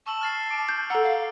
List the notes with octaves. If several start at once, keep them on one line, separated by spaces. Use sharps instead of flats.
A5 C#6 E6 F#7
F6 A6 C7
D6 D7
G6
A4 F#5 A#5 E6
F5